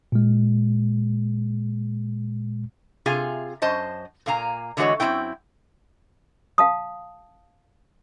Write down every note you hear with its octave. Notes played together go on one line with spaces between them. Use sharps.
A#2 G#3
C3 F4 G#4 G#5
F#2 C5 D#5 A5
A#2 A#3 F5 G#5 A#5
D3 E3 G#3 F#4 C#5 D#5
F#2 F3 C4 E4 G5
F5 A5 D#6